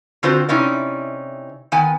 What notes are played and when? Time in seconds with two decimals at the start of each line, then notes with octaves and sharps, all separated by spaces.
0.23 D3 C4 F4 F#4 C5
0.49 C3 C#4 D#4 E4 D5
1.72 D#3 B3 G#5